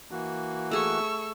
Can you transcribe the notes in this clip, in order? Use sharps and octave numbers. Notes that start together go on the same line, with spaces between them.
E3 A#3 F#4
A3 G#4 C#6 E6